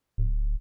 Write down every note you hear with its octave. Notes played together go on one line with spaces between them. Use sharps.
D1